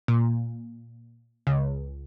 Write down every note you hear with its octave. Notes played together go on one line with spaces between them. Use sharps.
A#2
C#2